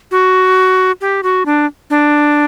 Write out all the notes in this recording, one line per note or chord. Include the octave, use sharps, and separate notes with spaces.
F#4
G4
F#4
D4
D4